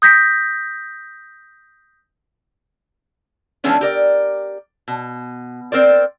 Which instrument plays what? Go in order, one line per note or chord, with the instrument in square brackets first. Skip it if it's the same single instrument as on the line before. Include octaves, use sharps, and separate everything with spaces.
[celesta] D#6 G6 A#6 B6
[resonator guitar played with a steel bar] E3 F3 G#3 B3 C#4 D4
G4 A#4 D5
B2
C4 A#4 C5 D5